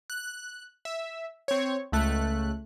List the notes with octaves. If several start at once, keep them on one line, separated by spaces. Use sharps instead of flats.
F#6
E5
C4 C#5
C#2 A3 F#6